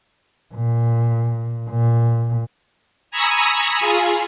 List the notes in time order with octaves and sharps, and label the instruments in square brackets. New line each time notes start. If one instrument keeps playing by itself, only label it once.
[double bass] A#2
A#2
[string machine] G#5 A#5 B5 C#6 D#6 E6
F4 G#4 G#5